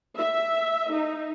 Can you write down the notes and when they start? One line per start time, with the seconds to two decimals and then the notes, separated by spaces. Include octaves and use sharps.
0.16 E5
0.92 D#4